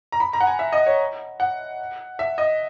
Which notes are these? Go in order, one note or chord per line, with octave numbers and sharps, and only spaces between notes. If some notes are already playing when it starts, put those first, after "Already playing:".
A#5
B5
A#5
F#5
G#5
E5
D#5
C#5
F#5
E5
D#5